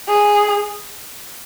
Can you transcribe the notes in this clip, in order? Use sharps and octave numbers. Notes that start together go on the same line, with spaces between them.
G#4